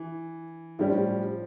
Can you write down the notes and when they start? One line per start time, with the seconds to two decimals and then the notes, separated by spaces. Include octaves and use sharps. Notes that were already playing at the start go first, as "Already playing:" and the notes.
Already playing: E3
0.79 A2 F3 G3 C#4